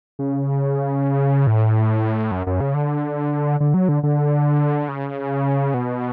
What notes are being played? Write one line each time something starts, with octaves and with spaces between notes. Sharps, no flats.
C#3
A2
F#2
F#2
C#3
D3
D3
F#3
D3
D3
C#3
B2